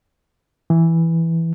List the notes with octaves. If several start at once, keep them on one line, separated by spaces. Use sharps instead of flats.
E3